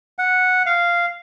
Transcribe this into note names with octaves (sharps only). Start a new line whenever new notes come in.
F#5
F5